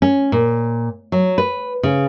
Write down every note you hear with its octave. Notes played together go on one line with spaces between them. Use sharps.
C#4
A#2
F#3
B4
C#3